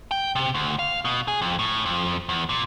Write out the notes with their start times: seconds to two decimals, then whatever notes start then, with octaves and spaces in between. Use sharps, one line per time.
0.11 G5
0.36 C3
0.55 D2
0.79 F5
1.05 B2
1.28 G#4
1.42 F2
1.59 A2
1.86 F2
2.29 E2
2.49 A#2